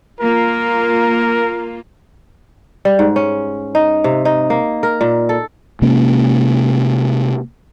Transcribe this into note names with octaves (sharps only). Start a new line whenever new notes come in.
A#3 F4 A#4
G3
G#2
C#4
D#4
C3
D#4
A#3
A#4
A#2
A4
C3 G#3 A#3 C#4